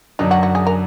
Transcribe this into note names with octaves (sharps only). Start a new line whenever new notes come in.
F#2 D3 F#3 D4 D#4
F#4
F#4
G#4
A#4